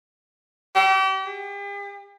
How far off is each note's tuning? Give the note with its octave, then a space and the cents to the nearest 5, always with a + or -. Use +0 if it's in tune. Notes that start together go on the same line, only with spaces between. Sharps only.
G4 -40
G4 +45